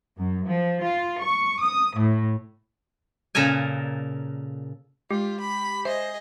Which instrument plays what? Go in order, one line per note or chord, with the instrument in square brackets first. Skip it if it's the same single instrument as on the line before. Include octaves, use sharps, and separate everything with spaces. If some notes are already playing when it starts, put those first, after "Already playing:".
[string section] F#2
F3
F4
C#6
D#6
A2
[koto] A#2 C#3 A4 A#4 G#5
[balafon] G#3 [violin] F4 [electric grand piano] G4
[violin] B5
[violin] G#4 D#5 [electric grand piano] C5 [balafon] E5